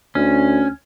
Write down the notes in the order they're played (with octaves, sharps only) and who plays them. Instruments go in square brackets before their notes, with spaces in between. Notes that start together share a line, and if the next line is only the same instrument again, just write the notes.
[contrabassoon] D2 [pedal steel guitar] C#4